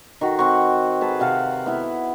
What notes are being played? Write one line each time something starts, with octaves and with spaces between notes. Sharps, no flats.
D#3 F#4
C4 F#5 C#6
G#4 B4 A5
C3 F5 F#5 A5
B3 E4